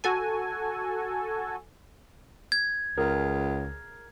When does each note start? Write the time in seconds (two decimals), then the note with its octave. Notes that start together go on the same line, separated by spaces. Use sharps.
0.04 F#4 A4 G#5
2.52 G#6
2.97 C#2 G#4 A#4